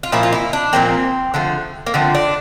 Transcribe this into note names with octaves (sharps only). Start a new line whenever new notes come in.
F4
A#2 F3 A#3 E4
F4
E4
D4
A#2 F3 A#3 C4
D3 F3 A3
A#3
D3 F3 A3 C4
D4